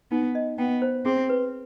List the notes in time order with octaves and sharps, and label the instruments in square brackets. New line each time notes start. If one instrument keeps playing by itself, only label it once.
[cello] B3 [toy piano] D#4
[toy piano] D#5
[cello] B3 [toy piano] G5
[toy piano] C5
[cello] C4 [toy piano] G#4
[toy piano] B4